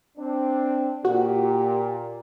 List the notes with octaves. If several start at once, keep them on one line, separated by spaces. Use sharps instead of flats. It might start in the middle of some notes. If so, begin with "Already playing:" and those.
C4 D4
A#2 F#4 G4